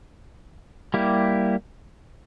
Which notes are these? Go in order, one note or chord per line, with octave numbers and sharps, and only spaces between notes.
G3 A#3 E4 G4